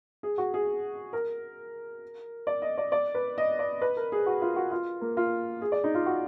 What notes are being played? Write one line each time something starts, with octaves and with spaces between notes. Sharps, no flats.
G#4
F#4
G#4
A#4
D5
D#5
D5
D5
B4
D#5
D5
B4
A#4
G#4
F#4
F4
F#4
F4
A#3
F4
G#4
D5
D#4
F4
F#4